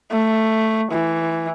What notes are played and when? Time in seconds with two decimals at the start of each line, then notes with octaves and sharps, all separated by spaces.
0.11 A3
0.91 E3